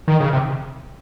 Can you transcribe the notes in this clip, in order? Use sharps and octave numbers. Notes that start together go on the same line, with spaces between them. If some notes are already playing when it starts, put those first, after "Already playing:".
D#3
C#3
C3